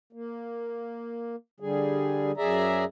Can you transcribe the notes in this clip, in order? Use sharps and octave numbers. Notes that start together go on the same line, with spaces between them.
A#3
D3 G3 G#4
F#2 G#4 D5 E5 A#5